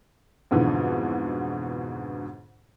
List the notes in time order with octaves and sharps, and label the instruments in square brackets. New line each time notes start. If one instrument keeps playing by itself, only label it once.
[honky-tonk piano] F2 G#2 B2 D3 E3